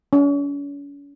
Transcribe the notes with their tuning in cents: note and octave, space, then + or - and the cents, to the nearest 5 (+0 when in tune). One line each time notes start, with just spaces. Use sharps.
C#4 +40